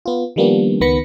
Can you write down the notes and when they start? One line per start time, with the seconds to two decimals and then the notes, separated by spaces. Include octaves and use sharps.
0.06 B3 F4
0.36 D#3 F3 G3 A#3 B3 D4
0.81 C#2 D#3 B3 B5 A#6 C#7